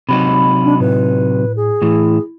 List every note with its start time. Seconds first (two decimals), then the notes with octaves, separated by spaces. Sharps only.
0.09 C3 F#3 D#4 B5
0.63 D4
0.80 A2 B4
1.56 G#4
1.82 A2 E3 E4